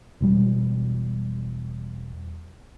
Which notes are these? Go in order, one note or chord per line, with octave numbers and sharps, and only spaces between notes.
E1 B2 G3